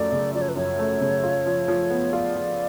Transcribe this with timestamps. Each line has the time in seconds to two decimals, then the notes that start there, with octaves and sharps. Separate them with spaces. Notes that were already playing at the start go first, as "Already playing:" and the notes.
Already playing: F#2 F3 A3 D5
0.12 C#3
0.34 F3 D5
0.41 C#5
0.49 B4
0.56 F#2 C#5
0.79 A3
1.01 C#3
1.23 F4
1.46 F3
1.68 F3
1.90 B3
2.13 F4 D5
2.36 F3